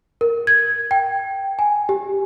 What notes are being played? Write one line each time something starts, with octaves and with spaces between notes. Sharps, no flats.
A#4
G#6
G5
G#5
G4